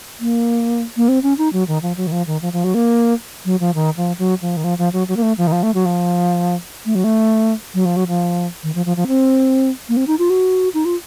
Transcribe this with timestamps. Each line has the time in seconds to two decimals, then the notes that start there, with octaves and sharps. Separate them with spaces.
0.20 A#3
0.97 A#3
1.08 C4
1.23 C#4
1.38 D#4
1.53 F#3
1.68 D#3
1.82 F3
1.97 F#3
2.07 D#3
2.12 F3
2.27 D#3
2.42 F3
2.53 F3
2.64 F#3
2.75 A#3
3.45 F#3
3.60 F3
3.75 D#3
3.97 F3
4.19 F#3
4.42 F3
4.57 D#3
4.64 F3
4.78 F3
4.93 F#3
5.08 F#3
5.17 A#3
5.22 A3
5.38 F3
5.47 D#3
5.52 F3
5.63 A3
5.74 F#3
5.85 F3
6.86 A3
6.95 F#3
7.04 A3
7.74 F#3
7.85 F3
7.96 F#3
8.08 F3
8.63 D#3
8.75 F3
8.86 F3
8.97 F3
9.08 C4
9.89 A#3
9.97 C4
10.07 D#4
10.19 F4
10.30 F#4
10.74 D#4
10.85 F4